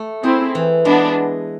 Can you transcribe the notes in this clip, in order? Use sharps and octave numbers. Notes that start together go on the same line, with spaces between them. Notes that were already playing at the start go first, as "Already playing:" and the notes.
Already playing: A3
C4 E4 G#4
E3
G#3 B3 D4